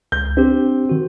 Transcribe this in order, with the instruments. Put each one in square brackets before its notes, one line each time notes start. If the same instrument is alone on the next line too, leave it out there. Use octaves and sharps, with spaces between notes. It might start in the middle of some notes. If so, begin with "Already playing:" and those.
[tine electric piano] C#2 [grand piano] G6
[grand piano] C4 [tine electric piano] D4 G4
[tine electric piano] D#3 F#4